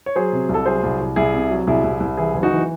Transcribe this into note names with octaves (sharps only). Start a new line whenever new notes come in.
C#5
F#3 G#4 C5
C3
C2
A4
F#3 G#4 C5
C2
C2
C2 E4 G#4
C3
F#3
C2 E4 G#4
C2
C2
E3 E4 G#4
F#1
D#4 F#4
E3